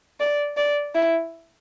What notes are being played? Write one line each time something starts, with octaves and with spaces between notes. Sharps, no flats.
D5
D5
E4